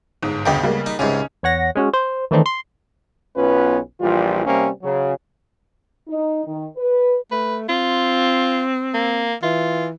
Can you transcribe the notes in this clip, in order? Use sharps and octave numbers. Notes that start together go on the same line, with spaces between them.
G1 G#2
D2 C#3 B3 D#5 G5
G3 G#3 A#3
D#4
C#2 G#2 C3 C#4 D#4
E2 C#5 F#5 A#6
G#3 C#4 F#4
C5
D#3 E3 A3 C4 D4 D#4
C6
B1 B3 C#4 F4 B4
A#1 E3 G3 F4
C3 G3 A#3 C4 C#4
C#3 F#3
D#4
D#3
B4
A3 B4
C4 F4
A#3
E3 F4